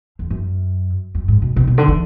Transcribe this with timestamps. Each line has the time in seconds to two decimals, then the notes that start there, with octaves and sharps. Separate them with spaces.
0.19 E2
0.30 F#2
1.15 F#2
1.28 G#2
1.42 B2
1.56 B2
1.67 B2
1.78 D3
1.88 E3